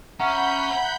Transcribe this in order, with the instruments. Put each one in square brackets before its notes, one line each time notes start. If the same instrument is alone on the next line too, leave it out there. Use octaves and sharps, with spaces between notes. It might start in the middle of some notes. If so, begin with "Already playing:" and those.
[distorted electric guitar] C#4 [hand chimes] E5 A#5 [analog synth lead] F#5 [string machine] B5 G6